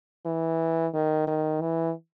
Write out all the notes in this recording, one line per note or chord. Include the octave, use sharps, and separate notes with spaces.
E3
D#3
D#3
E3